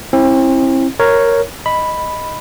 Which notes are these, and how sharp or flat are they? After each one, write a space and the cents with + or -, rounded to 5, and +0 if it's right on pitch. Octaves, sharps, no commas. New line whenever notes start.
C4 +35 E4 +0
A#4 +0 C#5 +0
D#5 +0 B5 +0